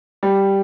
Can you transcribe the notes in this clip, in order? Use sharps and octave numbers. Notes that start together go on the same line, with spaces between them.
G3